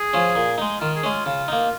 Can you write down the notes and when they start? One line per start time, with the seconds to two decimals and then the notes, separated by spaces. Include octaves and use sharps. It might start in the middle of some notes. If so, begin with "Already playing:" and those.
Already playing: G#4
0.13 F3 C#4
0.36 A#2
0.58 G#3 D#4
0.80 D#3 F4
0.96 G#4
1.03 G#3 C#4
1.11 F4
1.26 C#3
1.48 A#3 D#4